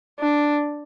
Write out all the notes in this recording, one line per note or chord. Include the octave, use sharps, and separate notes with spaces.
D4